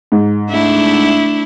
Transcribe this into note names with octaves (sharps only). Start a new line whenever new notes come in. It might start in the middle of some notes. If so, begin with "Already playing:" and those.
G#2
A3 D4 E4